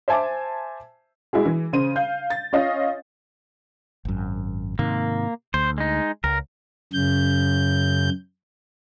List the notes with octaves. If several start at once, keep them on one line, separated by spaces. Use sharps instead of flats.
C5 E5 G#5 A5 D6
G#3 E4 F#4 G#4
E3
C#3 C5 D#7
F5 G6
A6
C#4 F4 C#5 D#5 F5
G#1 F#2
G#2 C3 D#3 A#3
D2 C5
G#3 D#4
C#2 A#4
F#2 C#3 G6